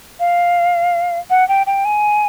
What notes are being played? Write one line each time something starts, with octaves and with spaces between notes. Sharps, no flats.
F5
F#5
G5
G5
G#5